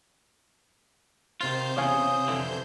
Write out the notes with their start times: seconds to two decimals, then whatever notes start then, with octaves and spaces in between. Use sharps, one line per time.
1.41 C3 D#3 F4 C5 G6
1.77 E2 C#3 C#5 F5 G#5 D#6
2.28 F2 D3 E3